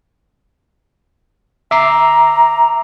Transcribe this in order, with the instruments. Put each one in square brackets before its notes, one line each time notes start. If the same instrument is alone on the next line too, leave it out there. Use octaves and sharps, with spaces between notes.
[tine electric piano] E5 D6 C7 [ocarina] A#5